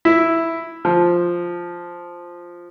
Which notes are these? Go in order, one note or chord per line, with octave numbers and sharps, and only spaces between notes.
E4
F3